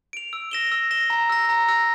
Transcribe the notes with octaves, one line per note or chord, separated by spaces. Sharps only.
D7 F7
E6
A#6 E7 G7
E6
A#6 E7 G7
A#5
E6 A#6
A#5
E6 A#6